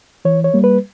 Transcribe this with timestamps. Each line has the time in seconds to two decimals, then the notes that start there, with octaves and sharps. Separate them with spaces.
0.25 E3 C#5
0.44 C#5
0.54 G3 A#3
0.64 B4